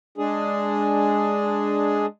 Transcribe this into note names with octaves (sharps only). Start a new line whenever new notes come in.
G#3 D4 G#4